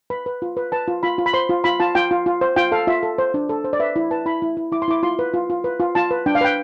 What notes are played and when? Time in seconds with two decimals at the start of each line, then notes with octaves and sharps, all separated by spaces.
0.10 B4 B5
0.26 B4
0.42 F4
0.57 B4
0.72 B4 A5
0.88 F4
1.03 F4 B5
1.18 F4
1.26 B5
1.33 C5 C6
1.49 F4
1.64 F4 B5
1.80 F4 A5
1.95 F4 G5
2.11 F4
2.26 F4
2.41 C5
2.56 F4 G5
2.72 A4 F5
2.87 F4 E5
3.03 A4
3.18 C5
3.34 D4
3.49 A4
3.64 C5
3.73 D5
3.80 B4 E5
3.96 E4
4.11 B4 A5
4.26 E4 B5
4.42 E4
4.57 E4
4.72 E4 D6
4.82 C6
4.88 E4 D6
5.03 F4 C6
5.19 B4
5.34 F4
5.50 F4
5.64 B4
5.80 F4
5.95 F4 A5
6.11 B4
6.26 D4 G5
6.35 F5
6.41 B4 G5